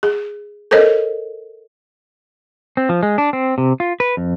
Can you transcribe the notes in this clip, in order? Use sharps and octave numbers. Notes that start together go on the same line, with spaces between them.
G#4
A4 A#4 C5 C#5 D#5
C4
F3
G#3
D4
C4
C3
F4
B4
F2